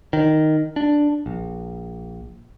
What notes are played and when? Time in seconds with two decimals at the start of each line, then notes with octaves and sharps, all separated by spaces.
0.13 D#3
0.76 D4
1.26 A#1